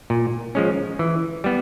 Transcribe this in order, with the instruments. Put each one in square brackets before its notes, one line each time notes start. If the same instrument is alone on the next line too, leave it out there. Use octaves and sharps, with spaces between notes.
[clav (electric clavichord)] A#2
F3 G#3 C#4
E3
G3 B3